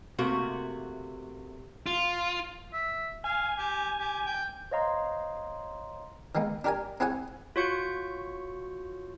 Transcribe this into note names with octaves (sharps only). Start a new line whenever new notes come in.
C3 A3 A#3 F#4
F4
E5
F5 G#5
G4
G4
G5
C5 C#5 D#5 F5 A#5 C6
D#3 G#3 A#3 B3
D4 G4 A#4 D5 G#5
C4 E4 G#4 C#5 F#5 G#5
F4 F#4 C#5 C#6 G6 C#7